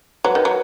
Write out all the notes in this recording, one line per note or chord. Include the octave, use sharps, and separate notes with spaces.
F#3 B4
D#3
F#3